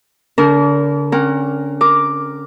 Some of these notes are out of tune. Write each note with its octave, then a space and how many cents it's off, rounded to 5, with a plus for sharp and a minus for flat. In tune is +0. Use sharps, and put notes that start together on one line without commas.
D3 -40 D4 -35 A#4 +0
C#4 -35 A#4 +0 F#5 +30
A#4 +0 D6 +0